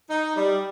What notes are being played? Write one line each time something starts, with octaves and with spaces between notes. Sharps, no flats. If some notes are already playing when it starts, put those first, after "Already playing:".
D#4
G3